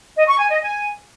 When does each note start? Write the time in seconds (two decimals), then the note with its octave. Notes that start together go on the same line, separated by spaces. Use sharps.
0.16 D#5
0.27 C#6
0.39 G#5
0.51 D#5
0.62 G#5